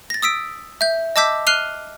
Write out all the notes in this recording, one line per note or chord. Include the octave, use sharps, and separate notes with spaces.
A6 A#6
D#6 E6 B6 D7
E5 G6
D#5 A5 D6 E6 G6 B6
F6 F#6 C7 D#7 F7 G7